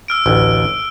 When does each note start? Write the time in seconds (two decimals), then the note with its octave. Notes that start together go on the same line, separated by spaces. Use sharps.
0.08 E6 F6 D7
0.26 A1 D2